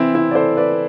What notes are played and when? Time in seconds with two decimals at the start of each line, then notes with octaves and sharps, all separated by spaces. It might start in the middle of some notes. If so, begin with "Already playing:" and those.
Already playing: C3 E3 C4 E4
0.14 C4 E4
0.31 D5
0.35 A4 C5
0.57 B4 D5